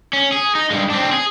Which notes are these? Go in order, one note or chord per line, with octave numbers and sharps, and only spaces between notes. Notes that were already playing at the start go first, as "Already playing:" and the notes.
C#4
G#4
D#4
G2 G#3
C4 D4
G#4